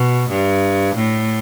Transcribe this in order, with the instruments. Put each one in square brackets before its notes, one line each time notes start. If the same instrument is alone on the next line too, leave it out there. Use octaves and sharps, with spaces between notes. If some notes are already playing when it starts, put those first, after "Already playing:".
Already playing: [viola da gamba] B2
G2
A2